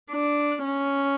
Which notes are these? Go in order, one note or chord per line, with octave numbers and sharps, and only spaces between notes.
D4
C#4